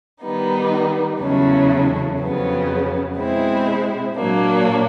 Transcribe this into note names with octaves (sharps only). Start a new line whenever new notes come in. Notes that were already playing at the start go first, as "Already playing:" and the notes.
D#3 G3 B3 D#4
E2 C#3 F#3 A3 C#4
F2 C#3 F#3 B3
B2 G#3 C4 E4
A#2 F#3 A#3 D4